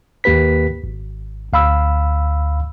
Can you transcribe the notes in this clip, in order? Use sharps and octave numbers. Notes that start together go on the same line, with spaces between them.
D#2 A#3 G4 B4 B6
G#1
D2 F5 B5 E6